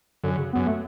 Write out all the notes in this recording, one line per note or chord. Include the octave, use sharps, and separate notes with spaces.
F#2 D3
C#3
F#2 B3
A3